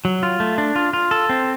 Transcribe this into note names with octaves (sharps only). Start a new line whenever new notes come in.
F#3
F4
A3
D4
F4
F4
A4
C4